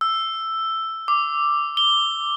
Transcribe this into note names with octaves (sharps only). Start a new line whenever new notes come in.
E6
D6
G7